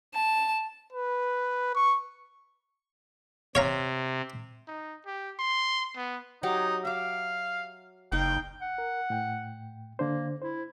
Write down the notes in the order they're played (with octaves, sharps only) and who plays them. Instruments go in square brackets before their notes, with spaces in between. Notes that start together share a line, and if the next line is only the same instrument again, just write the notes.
[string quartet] A5
[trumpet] B4
C#6
[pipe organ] C3 [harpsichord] C#5 F5 A#5
[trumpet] D#4
G4
C6
B3
[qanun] F#3 G4 D6 [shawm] D#4
[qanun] E5 D6 [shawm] F5
[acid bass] F#1 [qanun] D#4 F5 [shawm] G5
[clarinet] F#5
[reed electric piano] A#4
A2 G5
[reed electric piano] D3 D4 C5 [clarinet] A#3
[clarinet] E4 [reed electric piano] C5